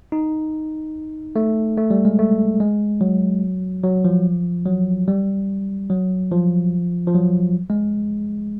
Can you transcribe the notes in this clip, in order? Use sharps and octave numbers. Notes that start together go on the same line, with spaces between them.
D#4
A3
A3
G3
G#3
A3
G#3
F#3
F#3
F3
F#3
G3
F#3
F3
F3
F#3
G#3